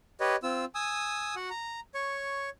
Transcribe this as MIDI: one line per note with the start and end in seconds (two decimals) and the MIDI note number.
0.20 0.36 67
0.20 0.36 71
0.20 0.36 73
0.20 0.36 75
0.43 0.65 60
0.43 0.65 65
0.43 0.65 88
0.75 1.35 80
0.75 1.35 87
0.75 1.35 88
1.36 1.49 66
1.36 1.49 78
1.50 1.80 82
1.94 2.49 73
1.94 2.49 85